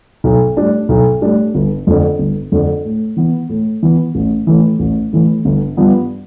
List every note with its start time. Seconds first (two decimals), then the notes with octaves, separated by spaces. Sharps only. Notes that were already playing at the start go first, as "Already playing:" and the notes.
0.24 B1
0.57 A2 G3 D4
0.89 B1
1.22 A2 G3 D4
1.54 G1
1.87 F2 D3
2.19 G1
2.52 F2 D3
2.85 A2
3.17 E3 B3
3.49 A2
3.83 E3 B3
4.15 A1
4.47 A2 E3
4.79 A1
5.13 A2 E3
5.45 G1
5.77 G2 F3 B3 D4